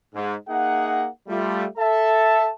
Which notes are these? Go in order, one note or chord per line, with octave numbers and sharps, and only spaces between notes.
G#2
A#3 D#4 G#4 E5 F#5
G3 A3 F4
A4 E5 A5